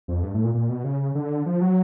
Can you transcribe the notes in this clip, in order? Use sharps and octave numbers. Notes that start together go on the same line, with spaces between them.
F2
G2
A2
A#2
A#2
B2
C#3
D3
F3
F#3